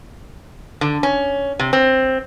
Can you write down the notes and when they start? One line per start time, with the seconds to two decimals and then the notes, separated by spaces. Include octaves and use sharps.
0.81 D3
1.03 C#4
1.59 C3
1.73 C4